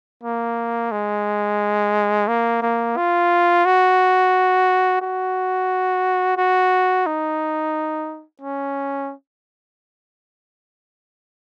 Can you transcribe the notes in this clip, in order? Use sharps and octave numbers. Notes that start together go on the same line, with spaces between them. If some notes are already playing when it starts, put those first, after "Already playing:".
A#3
G#3
A#3
A#3
F4
F#4
F#4
F#4
D#4
C#4